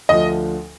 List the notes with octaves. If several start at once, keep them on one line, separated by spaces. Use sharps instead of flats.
D2 D3 F3 D#5